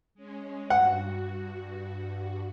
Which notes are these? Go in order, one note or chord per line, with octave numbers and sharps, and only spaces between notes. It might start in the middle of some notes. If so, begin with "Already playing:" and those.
G#3 C#4
G2 F#4 F#5